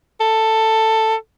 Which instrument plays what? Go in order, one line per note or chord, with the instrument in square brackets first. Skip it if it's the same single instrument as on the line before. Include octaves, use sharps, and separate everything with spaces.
[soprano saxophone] A4